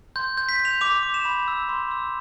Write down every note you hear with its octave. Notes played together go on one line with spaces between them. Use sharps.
C6 G6
G6
B6
G6
F7
D6 F7
D6
E7
B5
E6
C6
E6